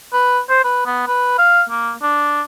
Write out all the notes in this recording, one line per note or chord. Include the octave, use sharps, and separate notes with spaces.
B4
C5
B4
B3
B4
F5
A#3
D4